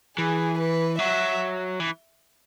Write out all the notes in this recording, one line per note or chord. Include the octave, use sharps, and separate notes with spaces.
E3 G#4
B4
F#3 E5
E3